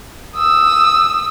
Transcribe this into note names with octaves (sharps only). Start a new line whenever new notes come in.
D#6 E6